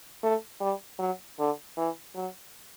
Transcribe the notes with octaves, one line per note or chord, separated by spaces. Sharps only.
A3
G3
F#3
D3
E3
F#3